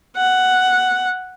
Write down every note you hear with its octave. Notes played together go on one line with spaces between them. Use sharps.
F#5